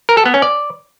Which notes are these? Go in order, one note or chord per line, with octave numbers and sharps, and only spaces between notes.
A#4
A4
B3
C#4
D5